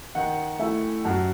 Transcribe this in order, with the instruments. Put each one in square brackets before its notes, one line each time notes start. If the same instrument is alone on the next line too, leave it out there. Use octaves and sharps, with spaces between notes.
[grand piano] D#3 [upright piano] D#5 F#5
[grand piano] A3 E4 [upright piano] E5 G#5
[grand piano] F#2 [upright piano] F#5 A5